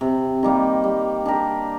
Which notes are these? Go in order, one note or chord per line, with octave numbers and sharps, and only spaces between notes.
C3
D#3 G3 A#3
G3
D4 G4 A#4